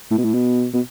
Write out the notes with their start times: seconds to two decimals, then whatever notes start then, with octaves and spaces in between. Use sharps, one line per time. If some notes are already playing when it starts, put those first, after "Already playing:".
0.11 A2
0.18 B2
0.25 A2
0.34 B2
0.74 B2